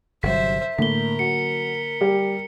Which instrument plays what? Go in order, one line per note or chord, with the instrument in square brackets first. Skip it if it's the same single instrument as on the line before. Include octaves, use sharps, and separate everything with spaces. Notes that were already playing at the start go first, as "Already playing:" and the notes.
[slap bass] G1 C3 F#3 [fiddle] C5 E5 [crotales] B6
[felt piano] A2 [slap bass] D3 A#3 [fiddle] A#4 [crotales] B6 G7
[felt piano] F#3 [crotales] C#7
[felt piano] G3 G4